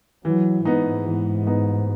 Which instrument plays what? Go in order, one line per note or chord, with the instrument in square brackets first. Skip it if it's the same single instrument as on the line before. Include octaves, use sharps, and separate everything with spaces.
[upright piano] E3 [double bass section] F#3
[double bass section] G#2 [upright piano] B3 D#4
[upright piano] E3
B3 D#4